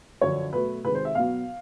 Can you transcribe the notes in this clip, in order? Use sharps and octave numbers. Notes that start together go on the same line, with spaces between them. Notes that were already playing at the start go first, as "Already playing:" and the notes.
F#2 D3 F3 C#5
B2 F#3 A3 B4
C3 D#3 G#3 B4
C5
E5
B2 F#3 B3 F5